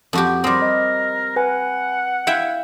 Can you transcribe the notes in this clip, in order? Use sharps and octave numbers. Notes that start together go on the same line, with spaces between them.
F2 F#4 G4
G3 C4 A#4 D6 D#6
D#5
B4 F#5 G#5
E4 E5 F5 G5